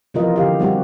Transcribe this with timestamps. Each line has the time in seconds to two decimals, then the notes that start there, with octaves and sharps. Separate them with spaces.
0.14 C3 E3 F3 F4 A#4 D#5
0.36 D3 G4 F5
0.59 G3 C4 F#4 G4